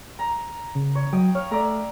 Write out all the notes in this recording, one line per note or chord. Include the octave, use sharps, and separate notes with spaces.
A#5
C#3
C#5
F#3 D#5 G5
C#5 F5
A3 D5 E5 A#5